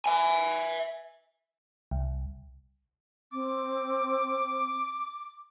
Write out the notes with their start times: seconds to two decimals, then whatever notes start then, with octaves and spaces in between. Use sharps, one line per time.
0.06 E5 G#5
1.91 C2
3.33 C4 D6